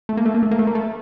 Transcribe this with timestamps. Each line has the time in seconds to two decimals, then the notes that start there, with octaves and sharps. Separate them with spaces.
0.09 A3
0.17 A#3
0.26 A3
0.34 A#3
0.43 A3
0.51 A#3
0.59 A3
0.67 A#3
0.75 A3